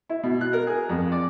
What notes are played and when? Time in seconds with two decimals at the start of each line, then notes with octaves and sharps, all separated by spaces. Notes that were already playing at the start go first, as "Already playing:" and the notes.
0.09 E4
0.23 B2
0.41 F#6
0.53 A#4
0.67 G#4
0.89 F2
1.12 D5